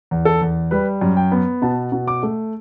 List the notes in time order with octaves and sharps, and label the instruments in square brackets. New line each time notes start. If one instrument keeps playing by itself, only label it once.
[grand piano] E2
A4
E2
G3 B4
F#2
G5
B3
B2 A5
B2
D6
A3